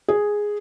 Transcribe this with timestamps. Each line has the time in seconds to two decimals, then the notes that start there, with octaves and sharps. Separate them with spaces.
0.08 G#4